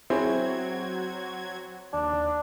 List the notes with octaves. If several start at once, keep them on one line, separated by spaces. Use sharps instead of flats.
F#3 C4 E4 F#4 G#4 C#5 G#6
D#2 D4